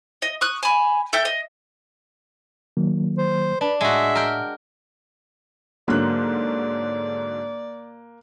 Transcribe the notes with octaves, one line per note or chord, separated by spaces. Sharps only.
D#5
C#6 D#6 F#6
G#5 B5
A4 E5 G5 G6
D#5
D#3 F#3 A#3
C5
D4 B4 D5
A2 G#3 F#4 E5
A#4 G5
G#2 D3 F#3 A#3 D5 F#6